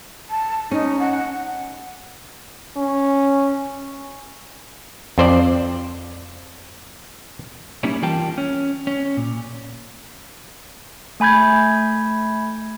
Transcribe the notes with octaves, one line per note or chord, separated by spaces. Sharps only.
A5
C#4 D#4
F#5
C#4
F2 C5 D5
G3 A#3 C#4 D#4 E4
E3 G3 F4 A#4 G5 A5
C#4
C#4
A#2
A3 G#5 B5 G6 G#6